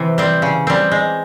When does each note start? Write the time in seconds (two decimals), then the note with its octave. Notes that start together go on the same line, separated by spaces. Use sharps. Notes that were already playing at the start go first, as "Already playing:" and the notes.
Already playing: C3 E3
0.18 G3 C4
0.42 C#3
0.67 G3 C4
0.91 G#3